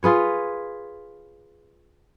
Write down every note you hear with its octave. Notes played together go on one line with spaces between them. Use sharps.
F4 G#4 B4 C#5